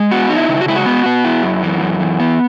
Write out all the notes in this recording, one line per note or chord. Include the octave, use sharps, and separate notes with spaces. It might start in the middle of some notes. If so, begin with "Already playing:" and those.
Already playing: G#3
B3 F#4
D#4
E4
C#3
F#4
G#3 E4
F#4
B3
B3
E4
F#2
E3
F#2
E3
B3